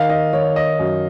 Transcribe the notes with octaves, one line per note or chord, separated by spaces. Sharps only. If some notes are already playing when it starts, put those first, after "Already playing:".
Already playing: D#3 F5
D#5
D#3 C#5
D#5
F#2